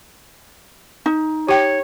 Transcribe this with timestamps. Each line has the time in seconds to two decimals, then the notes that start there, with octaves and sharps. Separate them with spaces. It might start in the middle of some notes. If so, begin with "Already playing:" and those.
1.06 D#4
1.48 G4 C#5 G5